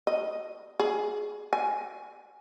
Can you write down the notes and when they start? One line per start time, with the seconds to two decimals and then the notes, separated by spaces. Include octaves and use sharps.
0.07 D#5
0.80 G#4
1.53 G#5